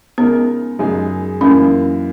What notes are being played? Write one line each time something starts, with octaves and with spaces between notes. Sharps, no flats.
C#3 G#3 B3 D#4 A#4
F#2 C#3 G#3 D#4 G#4
F#2 E3 A#3 C#4 D#4